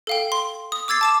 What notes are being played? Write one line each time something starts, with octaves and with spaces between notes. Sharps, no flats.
A4 F5 G5
C6
D#6
D6 E6 G#6 A6 C7
A5 D6 E7